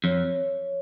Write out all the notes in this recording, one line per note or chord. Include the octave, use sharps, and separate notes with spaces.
F2 C#5